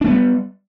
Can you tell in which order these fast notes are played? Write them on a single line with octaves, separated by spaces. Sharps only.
D4 A3 B3 G3